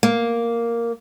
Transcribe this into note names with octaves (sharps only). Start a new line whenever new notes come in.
A#3